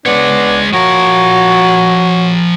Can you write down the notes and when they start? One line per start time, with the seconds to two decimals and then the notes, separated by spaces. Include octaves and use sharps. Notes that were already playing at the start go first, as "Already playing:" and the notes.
0.06 G#3 B3 D4 C#5
0.73 F3 F#4 A#4 C#5